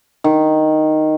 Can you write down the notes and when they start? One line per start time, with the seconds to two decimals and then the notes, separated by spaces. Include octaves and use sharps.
0.24 D#3